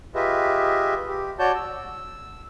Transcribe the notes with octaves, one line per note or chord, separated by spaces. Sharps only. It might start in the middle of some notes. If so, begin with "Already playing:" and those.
F4 G4 G#4 B4 D#5 E5
G4
F#4 C#5 D5 A5 G6
E6